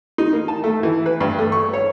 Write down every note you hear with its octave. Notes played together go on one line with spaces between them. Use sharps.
D#4
A#3
A5
A3
E3
B4
G2
A3
C#6
C#5